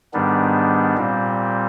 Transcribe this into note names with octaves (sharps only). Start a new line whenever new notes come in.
G#2 D#3 G3 B3 D4
A#2 G3 C4